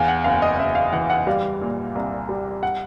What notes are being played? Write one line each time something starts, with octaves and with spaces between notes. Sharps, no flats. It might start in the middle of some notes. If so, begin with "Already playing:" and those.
Already playing: E2 F5
F#5
F#1 F5
D#5
F#1 E5
F5
E3 F#5
F#5
G3 F5
A#2
C2
G3
F#5